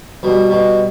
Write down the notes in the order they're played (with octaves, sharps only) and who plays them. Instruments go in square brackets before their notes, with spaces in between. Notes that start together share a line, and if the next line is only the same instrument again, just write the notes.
[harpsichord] B2 [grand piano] G3
[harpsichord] B2